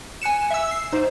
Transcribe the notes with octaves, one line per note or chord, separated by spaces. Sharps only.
G#5 F#6 C#7 E7
E5 E6
C7
D#4 C5